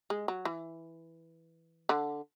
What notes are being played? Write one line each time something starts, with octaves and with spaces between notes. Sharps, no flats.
G#3
F#3
E3
D3